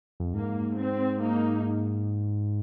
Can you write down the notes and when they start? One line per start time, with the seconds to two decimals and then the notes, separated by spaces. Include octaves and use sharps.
0.20 F2
0.33 G#2 A#3
0.77 C4
1.21 A#3 D#4